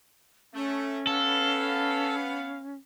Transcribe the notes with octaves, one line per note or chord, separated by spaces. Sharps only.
A3 C#4
B3 A4 F5